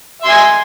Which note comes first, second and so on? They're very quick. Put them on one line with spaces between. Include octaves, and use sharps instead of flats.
E5 C6 G#5